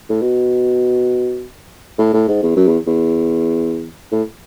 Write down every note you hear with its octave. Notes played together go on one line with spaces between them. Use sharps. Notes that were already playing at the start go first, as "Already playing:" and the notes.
A2
B2
A2
A2
G#2
E2
F#2
E2
E2
A2